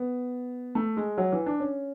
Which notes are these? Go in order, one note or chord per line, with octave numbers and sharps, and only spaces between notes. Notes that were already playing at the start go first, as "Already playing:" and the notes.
Already playing: B3
A3
G#3
F#3
E3
D4
C#4